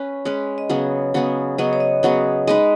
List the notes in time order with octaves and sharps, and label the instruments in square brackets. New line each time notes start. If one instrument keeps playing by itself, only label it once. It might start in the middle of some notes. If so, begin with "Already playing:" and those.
Already playing: [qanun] C#4 B4 [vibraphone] C#5
[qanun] G#3 C#4 B4
[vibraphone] D#5
[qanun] C#3 F#3 B3 G#4 [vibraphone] C#5
[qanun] C#3 F#3 B3 G#4
[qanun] C#3 F#3 B3 G#4 [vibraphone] D#5
[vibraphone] C#5
D#5
[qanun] C#3 F#3 B3 G#4
[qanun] G#3 D#4 B4 [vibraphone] D#5